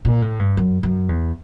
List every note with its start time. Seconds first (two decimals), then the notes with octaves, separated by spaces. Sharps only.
0.05 A#2
0.22 A2
0.39 G2
0.57 F#2
0.83 F#2
1.09 E2